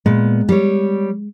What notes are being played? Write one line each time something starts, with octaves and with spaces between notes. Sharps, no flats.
A#2 G#3 B3
G3 C#5